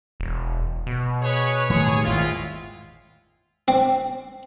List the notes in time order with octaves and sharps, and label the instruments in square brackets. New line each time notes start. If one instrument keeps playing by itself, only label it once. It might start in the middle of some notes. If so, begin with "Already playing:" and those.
[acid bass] E1
B2
[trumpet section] G#4 B4 C#5
[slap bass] A2 D#3 G3 [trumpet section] G#4 C#5
[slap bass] G#1 E2 A#2 [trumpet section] G#3 E4 F4
[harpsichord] C4